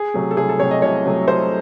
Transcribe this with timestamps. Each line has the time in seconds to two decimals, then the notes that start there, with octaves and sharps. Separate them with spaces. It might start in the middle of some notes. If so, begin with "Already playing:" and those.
Already playing: G#4
0.14 C3 F#3 A3
0.31 A4
0.37 C2 G#4
0.49 A4
0.59 C3 F#3 A3 C#5
0.71 D#5
0.82 C2 C#5
1.05 C3 F#3 A3
1.28 C2 C5